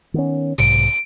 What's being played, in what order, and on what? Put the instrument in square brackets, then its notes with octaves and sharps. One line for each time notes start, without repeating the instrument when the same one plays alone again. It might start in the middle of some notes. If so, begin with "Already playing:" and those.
[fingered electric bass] D#3 B3 C#4
[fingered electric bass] B1 G#2 C3 [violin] D7